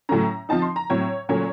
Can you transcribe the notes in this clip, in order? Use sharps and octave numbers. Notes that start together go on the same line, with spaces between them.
A2 F#3 A3 C#4 A#5
F3 C4 D#4 A5
C6
A#5
A2 F#3 C4 C#5
A#2 F#3 A3 C#4 C#5